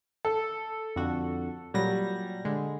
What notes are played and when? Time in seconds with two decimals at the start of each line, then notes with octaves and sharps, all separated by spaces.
0.25 A4
0.96 F2 D3 F#4
1.74 A#2 F#3 G3 A#6
2.45 D3 G#3